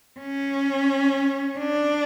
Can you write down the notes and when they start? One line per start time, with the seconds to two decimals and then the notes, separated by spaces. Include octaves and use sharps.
0.20 C#4
1.58 D4